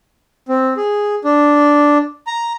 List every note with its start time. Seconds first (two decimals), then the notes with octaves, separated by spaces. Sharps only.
0.49 C4
0.77 G#4
1.24 D4
2.27 A#5